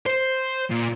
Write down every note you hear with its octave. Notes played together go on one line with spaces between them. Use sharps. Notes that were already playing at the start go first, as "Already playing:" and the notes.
C5
A#2